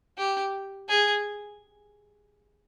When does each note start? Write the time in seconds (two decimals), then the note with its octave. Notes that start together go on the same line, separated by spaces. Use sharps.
0.18 G4
0.89 G#4